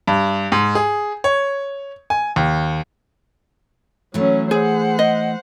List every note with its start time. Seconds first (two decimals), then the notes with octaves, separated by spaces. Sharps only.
0.08 G2
0.52 G#2
0.75 G#4
1.24 C#5
2.10 G#5
2.36 D#2
4.14 E3 F#3 A3 C#4
4.51 G#4 C5 F#5
4.99 D#5